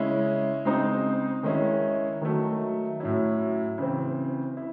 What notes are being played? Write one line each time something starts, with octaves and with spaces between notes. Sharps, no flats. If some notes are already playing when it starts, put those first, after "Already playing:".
Already playing: C#3 G#3 C#4 E4
C#3 G#3 C4 D#4
D#3 G#3 C#4 E4
D#3 F#3 A3
A2 F#3 C#4 E4
C#3 E3 C4
E4